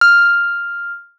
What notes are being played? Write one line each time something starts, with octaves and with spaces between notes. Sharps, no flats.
F6